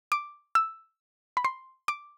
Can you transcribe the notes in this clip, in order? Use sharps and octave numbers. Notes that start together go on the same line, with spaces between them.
D6
E6
B5
C6
D6